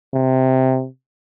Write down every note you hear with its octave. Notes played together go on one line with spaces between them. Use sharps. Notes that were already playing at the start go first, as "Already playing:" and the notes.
C3